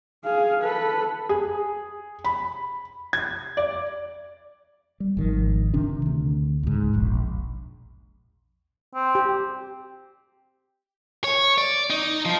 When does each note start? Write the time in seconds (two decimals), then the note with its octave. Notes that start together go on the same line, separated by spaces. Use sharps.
0.24 G#4 F5
0.62 A4 B4
1.29 G#4
2.24 B5
3.13 G#6
3.57 D5
5.00 G3
5.17 G#1 D#3 F3
5.74 C3 D#3 C4 D4
6.06 D2
6.63 C#2 G#2
6.93 E1 A#1
8.95 C4
9.15 G4
11.24 C#5
11.58 D5
11.90 D#4
12.25 F3